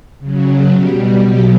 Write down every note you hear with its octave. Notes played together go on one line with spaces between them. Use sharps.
C#3 F#3
B2 G3 G4
B2 F#3 G4